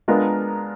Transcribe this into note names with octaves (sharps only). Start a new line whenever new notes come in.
G#3 B3 D4 F4 A#4